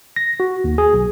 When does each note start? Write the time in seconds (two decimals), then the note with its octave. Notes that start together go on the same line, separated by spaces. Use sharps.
0.16 A#6
0.40 F#4
0.64 D#2
0.78 G#4
0.93 B1